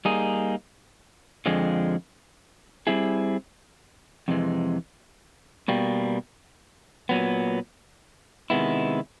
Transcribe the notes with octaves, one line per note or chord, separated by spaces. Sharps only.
G3 A#3 D#4 G#4
F2 D3 F3 G#3
G3 C4 E4 G#4
F2 C3 E3 G#3
B2 G3 A#3
A#2 F#3 B3
C3 D#3 G#3 B3 E4